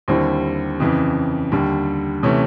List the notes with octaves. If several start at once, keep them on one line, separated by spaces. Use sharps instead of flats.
D#2 D3 G3 C4 E4
F2 C#3 E3
D#2 D3 G3
C3 E3 A3 C#4